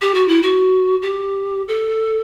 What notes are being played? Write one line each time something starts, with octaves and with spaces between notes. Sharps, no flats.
G4
F#4
E4
F#4
G4
A4